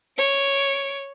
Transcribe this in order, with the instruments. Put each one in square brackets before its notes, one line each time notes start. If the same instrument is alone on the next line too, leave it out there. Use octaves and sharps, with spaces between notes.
[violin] C#5 D7